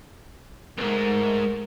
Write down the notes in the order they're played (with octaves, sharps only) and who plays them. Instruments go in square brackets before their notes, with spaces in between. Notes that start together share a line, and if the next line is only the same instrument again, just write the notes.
[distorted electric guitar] C2 G#2 [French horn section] A3 A#4